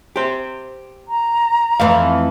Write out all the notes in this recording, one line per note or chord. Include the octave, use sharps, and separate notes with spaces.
G4 C5
A#5
F2 E3 A3 F5